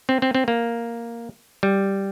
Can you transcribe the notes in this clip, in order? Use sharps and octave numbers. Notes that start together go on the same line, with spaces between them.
C4
C4
C4
A#3
G3